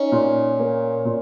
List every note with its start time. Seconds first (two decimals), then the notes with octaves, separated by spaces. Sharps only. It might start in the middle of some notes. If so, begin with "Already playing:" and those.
Already playing: C#4 D#4
0.12 A#2
0.59 A#3
1.05 A#2